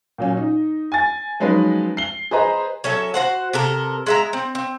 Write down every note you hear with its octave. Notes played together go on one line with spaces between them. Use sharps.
A#2 F#3 C#4
D#4
G#5 A6
F3 F#3 G#3 C#4 D#4 B4
C7 G7
G#4 B4 C5 D#5 A#5
F#3 C#4 A4 E5
F#4 C5 F#5
C3 A4 A#4
G#3 E5 A#5
C4
C4